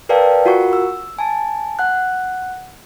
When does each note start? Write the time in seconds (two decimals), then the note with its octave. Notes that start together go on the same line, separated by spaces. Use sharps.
0.09 A#4 B4 D5 F5 G5 A5
0.46 F4 F#4 A#4 F#5 C#6
0.73 E6
1.19 G#5 A5
1.79 F#5 F#6